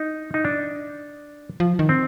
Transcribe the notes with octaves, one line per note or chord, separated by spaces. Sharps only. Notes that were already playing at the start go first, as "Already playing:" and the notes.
Already playing: D#4
D#4
D4
F3
D#3
C4